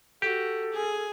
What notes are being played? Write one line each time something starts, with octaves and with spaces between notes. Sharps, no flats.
F#4 G4 A4
G#4 G#5